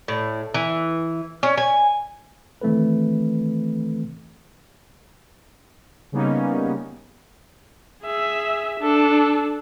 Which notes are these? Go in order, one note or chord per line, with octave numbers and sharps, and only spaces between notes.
A2
E3
C#4
G#5
D#3 E3 A3 C4 A4 B4
C#3 G3 A#3 B3 C#4 D#4
G#4 E5
D4 A4